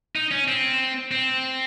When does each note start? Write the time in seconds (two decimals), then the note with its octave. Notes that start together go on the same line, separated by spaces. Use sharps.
0.15 D#4
0.31 C#4
0.48 C4
1.11 C4